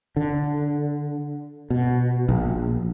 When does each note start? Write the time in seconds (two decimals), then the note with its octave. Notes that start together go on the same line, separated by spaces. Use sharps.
0.16 D3
1.70 B2
2.29 A#1